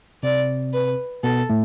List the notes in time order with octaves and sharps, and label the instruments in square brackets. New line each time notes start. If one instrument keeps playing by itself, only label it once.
[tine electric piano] C3 C4 [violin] D5
[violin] B4
[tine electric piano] B2 B3 [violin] A4
[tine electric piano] A2 A3